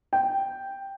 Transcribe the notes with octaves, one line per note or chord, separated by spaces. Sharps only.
G5